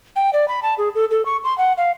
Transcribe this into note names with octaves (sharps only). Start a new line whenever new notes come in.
G5
D5
B5
A5
G#4
A4
A4
C#6
C6
F#5
F5